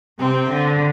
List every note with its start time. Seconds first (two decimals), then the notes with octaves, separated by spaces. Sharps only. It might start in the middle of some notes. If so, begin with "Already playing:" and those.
0.19 C3 C4
0.48 D3